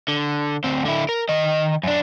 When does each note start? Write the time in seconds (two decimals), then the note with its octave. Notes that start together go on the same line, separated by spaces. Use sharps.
0.08 D3
0.64 D2 C4
0.85 D3 E4
1.09 A#4
1.29 D#3 D#5
1.83 F#2 D4